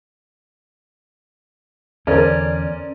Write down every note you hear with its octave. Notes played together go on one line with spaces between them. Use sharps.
E2 D3 C#4 A4 A#4 C5 D5